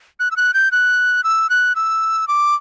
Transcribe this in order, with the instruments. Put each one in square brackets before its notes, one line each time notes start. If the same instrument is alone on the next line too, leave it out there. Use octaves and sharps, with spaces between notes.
[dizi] F#6
E6
F#6
G6
F#6
E6
F#6
E6
D6